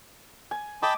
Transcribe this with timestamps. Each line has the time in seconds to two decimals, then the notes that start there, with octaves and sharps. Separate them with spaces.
0.51 G#5
0.82 D#5 G5 A5 B5 D6